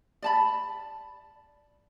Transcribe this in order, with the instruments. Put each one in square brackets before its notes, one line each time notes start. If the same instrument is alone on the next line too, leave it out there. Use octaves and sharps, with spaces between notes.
[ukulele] D5 A5 B5